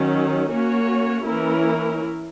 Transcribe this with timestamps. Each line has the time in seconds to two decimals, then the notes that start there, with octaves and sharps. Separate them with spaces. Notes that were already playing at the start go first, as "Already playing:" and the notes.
Already playing: D#3 F#3 C#4
0.51 A#3 C#4 F#4 C#5
1.27 E3 A#3 C#4 E4 A#4